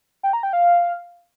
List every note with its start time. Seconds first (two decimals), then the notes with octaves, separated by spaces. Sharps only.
0.23 G5
0.33 A#5
0.43 G5
0.53 F5